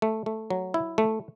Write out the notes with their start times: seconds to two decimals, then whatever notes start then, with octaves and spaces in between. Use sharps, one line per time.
0.02 A3
0.26 A3
0.50 F#3
0.74 E4
0.98 A3